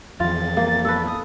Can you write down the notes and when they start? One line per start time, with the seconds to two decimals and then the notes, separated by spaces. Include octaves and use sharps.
0.20 F2 E3 F4 A6
0.57 A#3
0.85 A4 B4
1.07 D#6